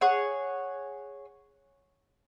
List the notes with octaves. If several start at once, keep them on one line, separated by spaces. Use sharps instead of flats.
G#4 C#5 F#5